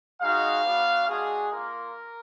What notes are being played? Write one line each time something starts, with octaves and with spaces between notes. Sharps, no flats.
G#3 D#4 F#4 F5
B3 D4 F#4
G#3 D4 F#4 G#4
A#3 F4 A#4